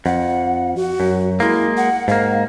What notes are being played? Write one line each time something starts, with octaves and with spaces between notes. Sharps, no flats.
F2 F#5
F#4
F#2
G#3 A#3 E4
F#5
G#2 A#3 F5